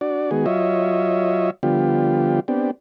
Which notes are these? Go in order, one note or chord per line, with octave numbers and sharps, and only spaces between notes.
D4 F#4 D5
D#3 G#3 B3 F#4 G#4
F#3 F4 C#5 D#5 E5
D3 F3 G3 B3 F4 G4
B3 C4 D4 G4